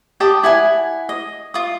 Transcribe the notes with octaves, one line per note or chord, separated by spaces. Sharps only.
G4 D5 A5 D#6
E4 F#5 G#5
D#5
F4 D#6